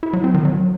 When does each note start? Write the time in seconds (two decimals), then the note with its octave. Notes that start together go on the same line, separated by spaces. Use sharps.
0.03 E4
0.13 F#3
0.24 C4
0.34 D#3
0.45 F#3